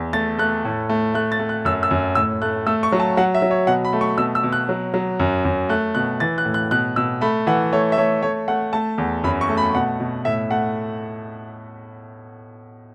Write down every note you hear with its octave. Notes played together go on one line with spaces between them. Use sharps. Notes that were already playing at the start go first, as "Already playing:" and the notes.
Already playing: E2
A3 A6
A3 F#6
A2
A3
A3 F#6
A6
A3
F#6
F#2 E6
E6
F#2
A2 E6
A3 F#6
A3 E6
C#6
F#3
A5
F#3 F#5
E5
F#3
C#5
B2 F#5
B5
A3
C#6
B2 E6
E6
B2
F#6
F#3
F#3
F#2
F#2
A3 F#6
B2 F#6
E3 A6
F#6
A2
F#6
B2 F#6
B2 E6
A3 B5
E3 F#5
A3 C#5
E5
A3 C#5
A3 C#5
A3 F#5
A3 A5
E2
F#2 B5
C#6
A3
B5
B2 F#5
B2
A2 E5
A3 F#5